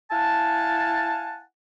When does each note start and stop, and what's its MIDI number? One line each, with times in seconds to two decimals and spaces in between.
0.11 1.42 64
0.11 1.42 77
0.11 1.42 78
0.11 1.42 80
0.11 1.42 81